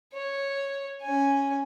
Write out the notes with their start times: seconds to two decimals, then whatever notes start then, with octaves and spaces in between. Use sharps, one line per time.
0.14 C#5
1.02 C#4 G#5